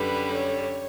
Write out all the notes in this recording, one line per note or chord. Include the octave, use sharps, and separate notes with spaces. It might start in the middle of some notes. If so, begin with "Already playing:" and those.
Already playing: F#2 D3 G3 B4
C#5